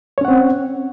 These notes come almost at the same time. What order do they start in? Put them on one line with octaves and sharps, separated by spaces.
C#5 C#4 F#5 C4